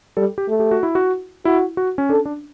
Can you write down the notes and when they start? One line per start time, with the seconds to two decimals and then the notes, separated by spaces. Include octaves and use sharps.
0.17 G3 A4
0.38 G4
0.49 A3
0.59 G4
0.71 F#4
0.83 E4
0.95 F#4
1.45 E4 F#4
1.77 F#4
1.98 C#4
2.09 D4 A4
2.25 D4